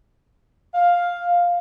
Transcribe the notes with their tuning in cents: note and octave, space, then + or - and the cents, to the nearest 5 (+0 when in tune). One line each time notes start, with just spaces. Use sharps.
F5 +5